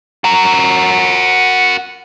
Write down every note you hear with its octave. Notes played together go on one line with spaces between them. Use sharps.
F#4 A#4